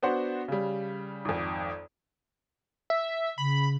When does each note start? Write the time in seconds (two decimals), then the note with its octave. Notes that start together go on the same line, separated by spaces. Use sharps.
0.03 B3 D4 F#4 C5 F#5
0.48 C#3 G3
1.25 G#1 F2
2.90 E5
3.38 C#3 B5